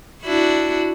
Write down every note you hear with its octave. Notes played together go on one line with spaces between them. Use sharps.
D4 E4 F#4